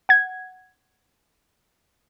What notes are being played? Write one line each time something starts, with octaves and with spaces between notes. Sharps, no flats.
F#5 G#6